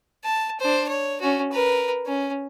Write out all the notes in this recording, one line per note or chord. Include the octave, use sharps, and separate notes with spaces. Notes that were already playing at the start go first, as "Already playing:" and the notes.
A5
D4 C5
C#5
C#4 F#4
A#4 B4
C#4